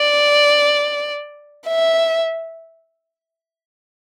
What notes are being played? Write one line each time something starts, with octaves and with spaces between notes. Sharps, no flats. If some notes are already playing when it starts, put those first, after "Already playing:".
Already playing: D5
E5